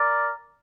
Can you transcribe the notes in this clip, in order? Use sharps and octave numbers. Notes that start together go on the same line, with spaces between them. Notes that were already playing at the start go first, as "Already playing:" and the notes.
Already playing: A#4 D5